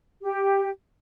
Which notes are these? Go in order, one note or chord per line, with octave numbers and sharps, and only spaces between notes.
G4